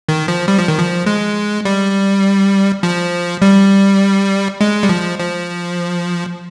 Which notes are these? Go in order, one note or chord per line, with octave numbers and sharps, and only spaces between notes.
D#3
F3
G3
F3
D#3
F3
G#3
G3
F3
G3
G#3
G3
F3
F3